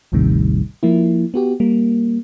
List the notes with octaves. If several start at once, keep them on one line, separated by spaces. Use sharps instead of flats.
A1 D#2 A2 C3 D#3 G3
F3 A#3 E4
B3 F#4 G4
G3 A#3